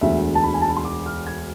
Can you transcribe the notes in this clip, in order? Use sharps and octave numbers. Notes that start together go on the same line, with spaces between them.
E1 D2 D3 E5
A5
B5
G#5
A5
B5
C6
D6
F6
G#6